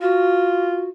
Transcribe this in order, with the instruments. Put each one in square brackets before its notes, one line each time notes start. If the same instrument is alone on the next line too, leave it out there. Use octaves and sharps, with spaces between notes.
[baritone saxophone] F4 [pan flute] F#4